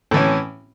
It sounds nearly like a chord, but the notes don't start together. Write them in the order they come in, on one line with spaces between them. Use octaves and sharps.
A2 E3 C#4